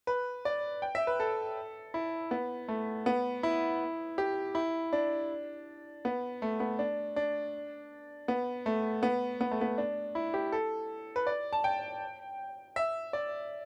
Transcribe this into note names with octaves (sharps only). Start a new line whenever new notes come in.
B4
D5
G5
E5
B4
A4
E4
B3
A3
B3
E4
G4
E4
D4
B3
A3
B3
D4
D4
B3
A3
B3
B3
A3
B3
D4
E4
G4
A4
B4
D5
A5
G5
E5
D5